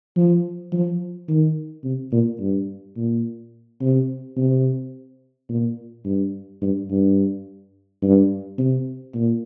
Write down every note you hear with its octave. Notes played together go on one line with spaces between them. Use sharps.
F3
F3
D#3
C3
A#2
G2
A#2
C3
C3
A#2
G2
G2
G2
G2
C3
A#2